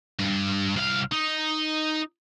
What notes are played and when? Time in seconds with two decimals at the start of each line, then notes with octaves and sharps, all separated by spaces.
0.19 G2
0.76 C2 F5
1.12 D#4